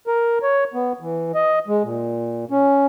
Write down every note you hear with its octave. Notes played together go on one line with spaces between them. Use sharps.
A#4
C#5
B3
E3
D#5
G#3
A#2
C#4